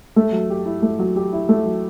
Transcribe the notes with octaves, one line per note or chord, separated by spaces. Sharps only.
A3
F#3
G4
E4
A3
F#3
G4
E4
A3
F#3